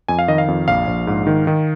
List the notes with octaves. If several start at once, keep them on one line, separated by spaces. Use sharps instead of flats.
F2 G#5
F5
D#3 D#5
F5
F2
A#1 F5
A#1
G#2
D#3
D#3